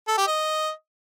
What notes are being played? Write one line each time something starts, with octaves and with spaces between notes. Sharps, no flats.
A4
G4
D#5